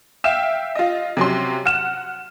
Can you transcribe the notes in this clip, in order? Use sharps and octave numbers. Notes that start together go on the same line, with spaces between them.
E5 F5 G5 E7
F4 D#5
C3 F#3 C#4 C6
F#5 F6 E7